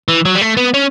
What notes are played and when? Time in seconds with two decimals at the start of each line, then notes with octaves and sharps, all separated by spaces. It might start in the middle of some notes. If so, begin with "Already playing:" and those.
0.08 E3
0.25 F#3
0.35 G3
0.41 A3
0.57 B3
0.74 C#4